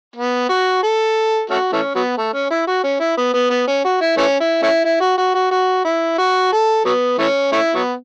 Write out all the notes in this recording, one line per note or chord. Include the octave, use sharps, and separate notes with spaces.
B3
F#4
A4
A3 C#4 F#4
E3 A3 C#4
F#3 B3
A3
C#4
E4
F#4
C#4
E4
B3
B3
B3
C#4
F#4
E4
E3 A3 C#4
E4
A3 C#4 E4
E4
F#4
F#4
F#4
F#4
E4
F#4
A4
F#3 B3
E3 A3 C#4
A3 C#4 E4
F#3 B3